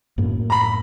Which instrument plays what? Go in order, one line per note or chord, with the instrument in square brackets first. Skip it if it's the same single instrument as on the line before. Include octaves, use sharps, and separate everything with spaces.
[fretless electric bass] F#2 A2 A#3
[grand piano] A#5 B5